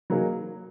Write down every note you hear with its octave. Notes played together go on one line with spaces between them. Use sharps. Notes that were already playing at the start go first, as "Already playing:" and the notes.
F#3 A#3 D#4 G#4